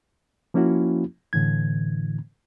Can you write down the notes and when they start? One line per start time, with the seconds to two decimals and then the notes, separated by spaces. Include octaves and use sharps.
0.54 F3 A#3 C#4 E4 F#4
1.33 A2 D3 E3 G#6